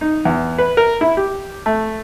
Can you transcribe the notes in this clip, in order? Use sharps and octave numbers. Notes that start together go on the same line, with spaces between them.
D#4
E2
B4
A#4
E4
G4
A3